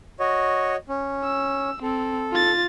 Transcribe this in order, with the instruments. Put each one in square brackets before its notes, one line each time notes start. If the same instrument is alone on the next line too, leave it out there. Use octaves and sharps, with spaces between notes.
[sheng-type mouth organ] F#4 C#5 D#5
C#4
[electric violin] E6
[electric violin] C4 [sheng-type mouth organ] A4
[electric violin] F4 A6